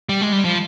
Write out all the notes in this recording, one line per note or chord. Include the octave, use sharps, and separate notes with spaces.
G3
G#3
G3
F3